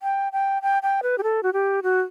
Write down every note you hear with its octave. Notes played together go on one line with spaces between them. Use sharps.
G5
G5
G5
G5
B4
G4
A4
F#4
G4
F#4